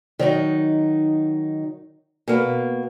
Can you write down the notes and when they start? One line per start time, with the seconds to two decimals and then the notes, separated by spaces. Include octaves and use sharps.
0.19 D#3 F#3 D#4
2.28 B2 A#3